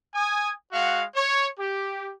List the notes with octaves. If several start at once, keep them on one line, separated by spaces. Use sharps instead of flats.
G#5 D#6
G#3 F#4 F5 F#5
C#5
G4